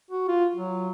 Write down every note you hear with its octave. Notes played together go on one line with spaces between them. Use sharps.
F#4
F4
F#3